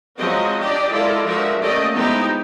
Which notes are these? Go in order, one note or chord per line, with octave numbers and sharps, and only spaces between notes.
F3 F#3 G#3 C4 F#4 D#5
D4 G4 D5 D#5
G#3 E4 F4 A4 A#4 D5
D3 F3 G#3 F#4 A#4 E5
A3 A#3 C#4 G4 D5 D#5
F3 G#3 B3 D#4 E4 G4